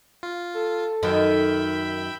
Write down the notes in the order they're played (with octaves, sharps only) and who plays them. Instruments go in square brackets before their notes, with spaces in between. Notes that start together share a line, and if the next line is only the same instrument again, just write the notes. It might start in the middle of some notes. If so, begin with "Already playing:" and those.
[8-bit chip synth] F4
[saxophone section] A4
[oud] F#2 D#3 [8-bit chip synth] E5 G5 B5